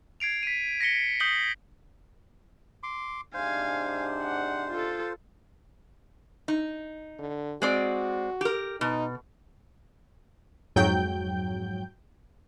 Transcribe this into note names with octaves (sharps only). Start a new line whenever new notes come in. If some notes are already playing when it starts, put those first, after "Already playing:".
G#6 C7 D7 F7
B6 D#7
A#6 B6 C#7 G7
D#6 G6 B6 C7 F#7 G7
C6 D6
G#2 C3 D4 C5 F5 G#5
F#5
F4 A4
D#4
D3
G#3 C4 F#4 D5
G4 A#4
B2 D#4
F2 G#2 F#3 G5 G6